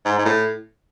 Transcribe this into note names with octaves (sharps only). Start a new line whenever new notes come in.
G#2
G#2
A2